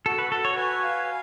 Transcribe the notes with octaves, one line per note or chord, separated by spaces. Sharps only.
F#4 A4
B4
F#4 A4
C#5
B4 G#5
F5